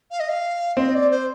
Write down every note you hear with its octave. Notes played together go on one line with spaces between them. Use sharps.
F5
D#5
F5
C4 D#5
D5
C5